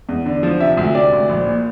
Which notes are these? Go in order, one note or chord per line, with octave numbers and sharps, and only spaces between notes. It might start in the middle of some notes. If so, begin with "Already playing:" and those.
E2
D3
F3
C3 E5
D2
C3 D5
D2
A#1
A#2